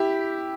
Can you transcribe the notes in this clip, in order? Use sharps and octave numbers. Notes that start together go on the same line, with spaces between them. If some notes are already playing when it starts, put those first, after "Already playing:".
Already playing: E4 G4